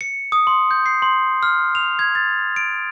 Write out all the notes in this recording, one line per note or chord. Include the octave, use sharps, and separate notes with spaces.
C#7
D#6
C6
G6
C7
C6
F6
F7
G#6
A6
D7